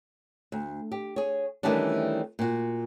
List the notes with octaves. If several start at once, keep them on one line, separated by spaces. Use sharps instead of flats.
D2
G4
G#4 C#5
D#3 E3 G3 A3 C#4 D4
A#2 F#4